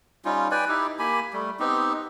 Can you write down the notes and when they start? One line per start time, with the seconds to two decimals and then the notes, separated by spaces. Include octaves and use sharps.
0.25 G3 C#4 D#4 F4
0.51 B4 D5 G5 G#5
0.68 D#4 E4 G4
0.99 A#3 G4 G#5 B5
1.33 G3 A3
1.60 B3 C4 D#4 G4